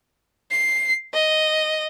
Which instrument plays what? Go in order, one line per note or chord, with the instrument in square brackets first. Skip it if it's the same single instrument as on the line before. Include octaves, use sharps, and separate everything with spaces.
[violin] C7
D#5